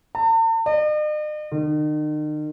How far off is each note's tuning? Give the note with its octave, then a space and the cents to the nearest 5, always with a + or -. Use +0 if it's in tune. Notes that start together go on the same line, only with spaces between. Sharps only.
A5 +45
D#5 -45
D#3 -40